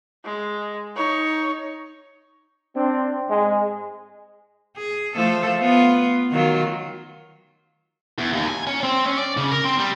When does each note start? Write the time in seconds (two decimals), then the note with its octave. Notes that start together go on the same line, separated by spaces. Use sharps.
0.25 G#3
0.96 D#4 C#5
2.74 C4 D4
3.29 G#2 G#3
4.77 G#4
5.16 F3 A3 A4
5.61 B3 F4
6.32 D#3 F#3 F4
8.18 E2
8.33 D#2
8.48 G#5
8.67 C#4
8.83 C4
9.06 C#4
9.18 D5
9.37 C#3
9.51 A#4
9.64 C4
9.79 G3